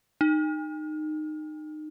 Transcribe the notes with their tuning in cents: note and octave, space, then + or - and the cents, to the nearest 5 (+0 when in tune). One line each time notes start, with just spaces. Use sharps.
D#4 -20